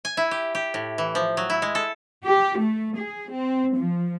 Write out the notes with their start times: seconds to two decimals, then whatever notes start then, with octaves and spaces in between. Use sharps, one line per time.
0.05 G#5
0.17 E4
0.31 G4
0.55 G4
0.74 A2
0.98 E3
1.15 F3
1.37 F#3
1.50 E4
1.62 G#3
1.75 A4
2.23 G4
2.58 A3
2.96 G#4
3.32 C4
3.74 F3